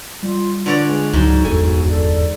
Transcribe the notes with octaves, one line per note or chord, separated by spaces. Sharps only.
G3 F4
D3 F4 B4 C#5 D5
G#3
C#2 G#2 F3 F#3 D#4 F#4
D1 G1 E2 A4 G#5
A4 D5